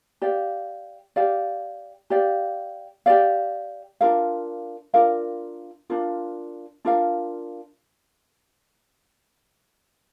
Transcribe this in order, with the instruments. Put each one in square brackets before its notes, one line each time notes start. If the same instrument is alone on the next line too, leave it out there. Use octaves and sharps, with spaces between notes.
[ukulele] G4 D5 F5
G4 D5 F5
G4 D5 F5
G4 D5 F5
D4 F4 A#4 F5
D4 F4 A#4 F5
D4 F4 A#4 F5
D4 F4 A#4 F5